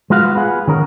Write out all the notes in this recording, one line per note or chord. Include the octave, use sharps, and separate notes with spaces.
G#3 B3 F4 F#4 F5
B3 F4 G#4 F#5
D#3 C#4 A#4